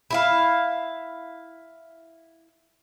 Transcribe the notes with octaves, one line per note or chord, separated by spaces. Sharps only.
E4 E5 F5